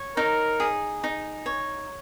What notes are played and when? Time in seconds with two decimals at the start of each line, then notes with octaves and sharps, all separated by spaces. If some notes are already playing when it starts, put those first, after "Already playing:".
Already playing: C#5
0.17 D#4 A#4
0.60 G#4
1.04 D#4
1.46 C#5